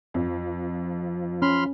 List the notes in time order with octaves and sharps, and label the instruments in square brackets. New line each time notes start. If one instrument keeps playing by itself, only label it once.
[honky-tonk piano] F2 [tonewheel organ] F3
[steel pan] C#4 [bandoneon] B5 C6 F6